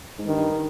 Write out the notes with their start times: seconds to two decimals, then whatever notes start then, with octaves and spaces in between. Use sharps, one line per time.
0.19 G#2
0.27 G2 D#3